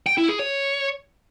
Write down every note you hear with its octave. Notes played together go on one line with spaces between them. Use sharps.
G5
E4
G#4
C#5